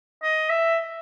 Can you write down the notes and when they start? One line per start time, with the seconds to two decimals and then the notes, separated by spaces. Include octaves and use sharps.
0.23 D#5
0.50 E5